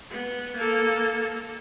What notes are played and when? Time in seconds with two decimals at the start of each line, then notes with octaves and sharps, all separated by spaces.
0.10 B3
0.56 A#3 A4